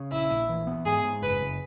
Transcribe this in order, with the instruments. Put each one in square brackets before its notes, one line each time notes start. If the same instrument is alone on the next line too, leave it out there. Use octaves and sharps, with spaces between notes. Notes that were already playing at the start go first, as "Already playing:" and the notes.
Already playing: [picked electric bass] C#3
[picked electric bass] A#1 [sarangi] E4
[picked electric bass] A#1
E3
B3
[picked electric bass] G#2 [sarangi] G#4
[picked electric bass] G#2
[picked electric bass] F#1 [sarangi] B4
[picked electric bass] F#1